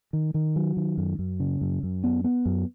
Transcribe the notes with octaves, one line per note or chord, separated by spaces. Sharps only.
D#3
D#3
F#3
D#3
F#2
F#2
C#3
F#2
F#2
B3
B3
F#2